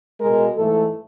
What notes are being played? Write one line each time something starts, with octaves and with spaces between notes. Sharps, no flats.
B2 G#3 A#4
G#2 E3 A3 A4